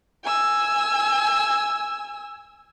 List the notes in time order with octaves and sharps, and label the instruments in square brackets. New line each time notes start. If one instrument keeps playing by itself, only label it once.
[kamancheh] G#5 E6